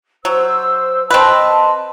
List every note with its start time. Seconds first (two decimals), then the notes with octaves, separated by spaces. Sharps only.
0.25 F#3 C5 E6
1.10 C4 B4 D#5 A5 C6